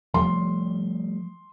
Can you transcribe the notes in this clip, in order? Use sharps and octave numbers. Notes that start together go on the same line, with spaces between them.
F3 G3 A3 C6